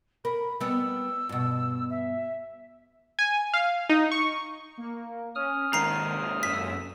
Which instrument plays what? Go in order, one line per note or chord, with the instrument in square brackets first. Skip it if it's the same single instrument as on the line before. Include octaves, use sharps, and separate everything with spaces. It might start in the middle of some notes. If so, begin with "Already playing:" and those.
[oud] A#4 [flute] B5
[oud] G3 B3 [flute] E6
[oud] G2 B2
[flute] E5
[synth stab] G#5
F5
D#4
C#6
[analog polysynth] A#3
[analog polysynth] C#4 [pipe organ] D#6 F6
[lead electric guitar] G#2 C3 [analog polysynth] D#3 [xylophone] A#5 C7
[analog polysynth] F#2 E6 [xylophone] B6